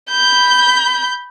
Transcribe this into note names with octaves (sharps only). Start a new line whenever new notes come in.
B5 G6